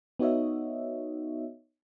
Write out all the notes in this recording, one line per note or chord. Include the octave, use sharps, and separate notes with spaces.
B3 D#4 F#4 C#5 D#5 E5